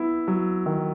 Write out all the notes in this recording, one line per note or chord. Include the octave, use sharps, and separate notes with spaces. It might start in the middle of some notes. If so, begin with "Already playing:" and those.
Already playing: B3 E4
F#3
D#3